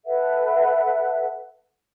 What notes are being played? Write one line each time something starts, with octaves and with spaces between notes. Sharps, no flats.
A4 B4 E5 F#5